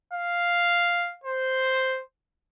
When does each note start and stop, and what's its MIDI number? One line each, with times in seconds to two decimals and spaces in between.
0.13 1.15 77
1.24 2.01 72